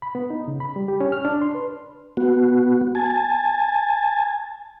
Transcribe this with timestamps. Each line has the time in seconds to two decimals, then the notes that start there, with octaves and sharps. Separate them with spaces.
0.02 B5
0.15 B3
0.30 D#4
0.48 C#3
0.60 B5
0.76 G3
0.88 G4
1.00 C#4
1.12 F6
1.25 D4
1.42 C6
1.55 B4
2.17 B3 F#4
2.95 G#5 A5